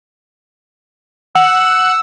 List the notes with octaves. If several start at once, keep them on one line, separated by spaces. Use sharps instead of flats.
F#5 E6